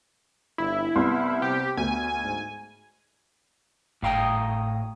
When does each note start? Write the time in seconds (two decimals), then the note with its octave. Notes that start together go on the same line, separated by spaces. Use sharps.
0.58 G1 E4
0.96 C2 B3 C6
1.42 C3 G4
1.77 D2 B3 G#5
2.24 G#2
4.03 G#1 A2 F5 G5 A#5 D#6